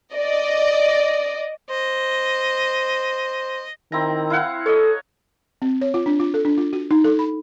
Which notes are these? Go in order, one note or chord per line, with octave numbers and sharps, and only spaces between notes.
D5 D#5
C5 D#5
D#3 C4 E4 A#5
E4 F5 F#5
A4 C#5 D#5
C4
C#5
F4
D4
F4
A4
D4
F4
F#4
D#4
A4
B5